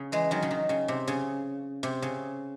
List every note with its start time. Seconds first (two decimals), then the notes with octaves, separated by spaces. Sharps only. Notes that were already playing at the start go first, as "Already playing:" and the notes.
Already playing: C#3
0.12 E3 G#3
0.31 D#3 F#3
0.42 C#3
0.51 D#3
0.69 C#3
0.88 C3
1.08 C#3
1.83 C3
2.02 C#3